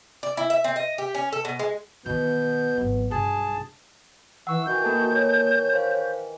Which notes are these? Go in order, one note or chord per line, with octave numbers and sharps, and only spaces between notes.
D5
E4
E5
C4
D#5
G4
C#4
A4
B2
G#3
B2 D#3 E3 B3 G6
G#1 F#3
B1 G2 G#4 A5
E3 F#5 C#6 E6
D#3 E3 F#4 G6
A#3 A4 A5
C#5
C5 F5